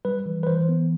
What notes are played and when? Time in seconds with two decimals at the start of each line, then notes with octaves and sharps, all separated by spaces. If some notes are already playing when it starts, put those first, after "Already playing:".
0.05 G3 B4
0.26 E3
0.43 B4
0.47 E3 C5
0.69 B3